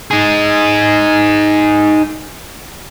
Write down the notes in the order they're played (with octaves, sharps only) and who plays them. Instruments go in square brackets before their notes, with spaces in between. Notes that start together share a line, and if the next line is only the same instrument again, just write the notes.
[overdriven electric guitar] D#4 G#4